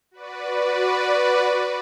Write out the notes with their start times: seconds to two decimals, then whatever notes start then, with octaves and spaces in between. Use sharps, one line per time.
0.11 F#4 B4 D5